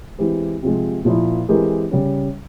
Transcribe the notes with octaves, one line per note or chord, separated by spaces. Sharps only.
E3 G#3 C4 G4
C3 F3 G#3
A#2 F3 A#3 E4
E3 G#3 C4 G4 A#4
C#3 G3 C#4